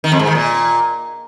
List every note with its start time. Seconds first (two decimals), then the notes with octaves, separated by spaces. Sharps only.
0.04 D#3
0.12 F2
0.19 G#2
0.27 D#3
0.35 A#2